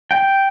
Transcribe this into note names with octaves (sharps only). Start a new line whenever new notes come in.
G5